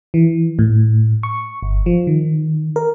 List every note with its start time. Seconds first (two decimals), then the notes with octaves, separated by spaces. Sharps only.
0.14 E3
0.59 A2
1.23 C#6
1.63 G1
1.86 F3
2.07 D#3
2.76 A#4